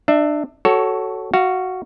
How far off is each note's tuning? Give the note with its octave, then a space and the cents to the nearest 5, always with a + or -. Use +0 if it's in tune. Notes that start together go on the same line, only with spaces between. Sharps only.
D4 +25 E5 +0
F#4 +20 A4 +0 C#5 +0
F#4 +0 F5 -20